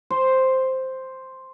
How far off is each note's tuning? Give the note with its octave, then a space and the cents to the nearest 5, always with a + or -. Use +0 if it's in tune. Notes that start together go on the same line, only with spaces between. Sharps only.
C5 +0